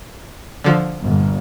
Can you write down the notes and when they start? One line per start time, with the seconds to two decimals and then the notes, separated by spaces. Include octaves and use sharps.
0.64 D3 F3
1.01 G1 A#2